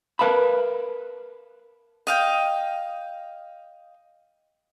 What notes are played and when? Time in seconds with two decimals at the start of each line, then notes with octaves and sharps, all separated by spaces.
0.19 A#4 B4 F5 A5 B5
2.07 D#5 F5 G5